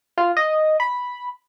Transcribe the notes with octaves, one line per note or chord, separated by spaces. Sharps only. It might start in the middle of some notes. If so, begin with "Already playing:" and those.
F4
D#5
B5